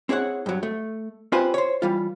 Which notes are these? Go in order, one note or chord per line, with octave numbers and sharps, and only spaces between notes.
C4 E4 G#4 C#5 F#5
G2 F#3
A3
C4 F4 G4 B4 C5 G#5
C5 C#5
E3 G3 F4